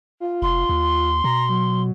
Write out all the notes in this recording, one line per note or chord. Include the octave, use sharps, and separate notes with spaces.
F4
F1 C6
D#2
B2 A#5
F#3